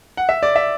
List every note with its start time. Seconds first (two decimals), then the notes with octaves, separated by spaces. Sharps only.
0.17 F#5
0.29 E5
0.43 D5
0.56 E5